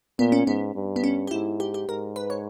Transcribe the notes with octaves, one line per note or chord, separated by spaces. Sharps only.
A#2 B3
C#4
G#2 B3
G2
B3
C#4
G4
G#2 E4
G4
G4
G#2 A#4
B4
C#5